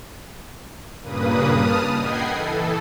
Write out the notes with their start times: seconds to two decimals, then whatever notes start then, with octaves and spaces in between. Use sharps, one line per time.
1.02 G2 A#2 C#3 A#3 B4 D#6
1.53 A5 D#6 F6
1.96 D#5 F#5 G5 B5 G#6 C7
2.29 E3 A4